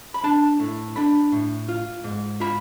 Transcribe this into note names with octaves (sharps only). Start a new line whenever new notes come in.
B5
D4 A5
A2
D4 B5
A2
F4
G#2
F4 B5